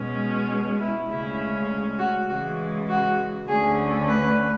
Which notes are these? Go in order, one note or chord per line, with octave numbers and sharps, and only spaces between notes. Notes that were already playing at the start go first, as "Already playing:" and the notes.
Already playing: B2 G#3 C#4
E4
D2 C#3 G#3 C#4 E4
F#4
C#3 E3 G#3 F#4
F#4
D2 D3 A3 C#4 G#4
B4